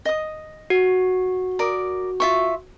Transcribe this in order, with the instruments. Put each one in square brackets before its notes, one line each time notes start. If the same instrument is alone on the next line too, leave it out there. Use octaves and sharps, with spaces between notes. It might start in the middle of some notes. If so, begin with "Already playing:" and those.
[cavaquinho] D#5 D#6
[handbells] F#4
[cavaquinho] A#4 D5 D#6
F4 E5 C#6